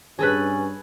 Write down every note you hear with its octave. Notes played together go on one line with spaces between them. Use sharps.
G2 C#4 G#4 A4 B4